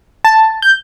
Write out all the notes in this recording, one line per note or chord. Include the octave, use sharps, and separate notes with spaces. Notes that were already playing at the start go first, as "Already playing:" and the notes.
A5
G6